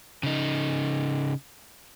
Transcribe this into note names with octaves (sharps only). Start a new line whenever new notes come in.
C#3 D#4